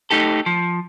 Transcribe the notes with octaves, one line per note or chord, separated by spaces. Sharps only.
A3 D#4 G4 A4
F3